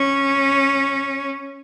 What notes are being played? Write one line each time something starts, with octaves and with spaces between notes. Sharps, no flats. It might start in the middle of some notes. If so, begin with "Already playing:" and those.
Already playing: C#4